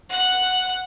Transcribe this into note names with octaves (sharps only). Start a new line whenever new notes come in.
F#5